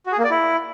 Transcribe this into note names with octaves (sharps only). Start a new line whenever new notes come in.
F#4
G#4
A#3
D5
E4